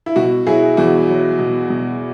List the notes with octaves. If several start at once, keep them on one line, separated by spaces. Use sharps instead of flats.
E4
B2 F#4
F#3 E4 G#4
E2 F#4
F#3
B2
B2